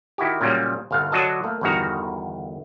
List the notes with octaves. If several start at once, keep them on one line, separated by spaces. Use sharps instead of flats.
D#3 E4 F#4 G4
A#2 C#3 F#3 G3 A#3
G1 C2 F5 F#5
D3 F#3 D4 F#4 D#5 A5
A3 A#3
G1 E2 G2 D#3 F#4 A#5